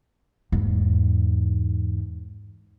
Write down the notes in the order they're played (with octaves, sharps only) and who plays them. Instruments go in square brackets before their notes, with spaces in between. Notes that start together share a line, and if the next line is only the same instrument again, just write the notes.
[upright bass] E2 G#2